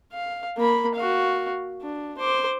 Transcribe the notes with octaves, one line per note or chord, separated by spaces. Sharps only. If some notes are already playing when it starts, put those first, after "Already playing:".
F5
A#3 B5
F#4 F5
D4
C5 D6